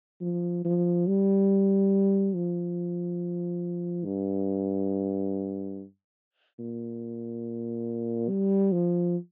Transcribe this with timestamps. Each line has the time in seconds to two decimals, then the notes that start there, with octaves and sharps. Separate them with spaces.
0.21 F3
0.65 F3
1.07 G3
2.35 F3
4.05 G2
6.59 A#2
8.29 G3
8.72 F3